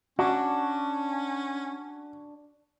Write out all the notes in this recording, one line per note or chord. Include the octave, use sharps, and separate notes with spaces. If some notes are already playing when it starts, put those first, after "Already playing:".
C#4 D4 F#4